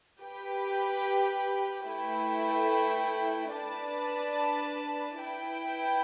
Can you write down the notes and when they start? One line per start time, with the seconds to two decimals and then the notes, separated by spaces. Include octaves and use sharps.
0.20 G4 B4 G5
1.86 A3 E4 B4 G5
3.52 D4 B4 D5 A5
5.19 E4 B4 G5